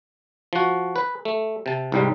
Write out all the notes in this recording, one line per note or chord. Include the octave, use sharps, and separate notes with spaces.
F3 F#4
B4
A3
C3 A5
C2 G#2 G3